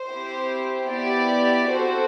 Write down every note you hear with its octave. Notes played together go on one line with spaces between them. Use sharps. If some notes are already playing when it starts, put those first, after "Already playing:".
Already playing: C5
C4 E4 G4
B3 E4 G4 D5
C4 F#4 A4 C5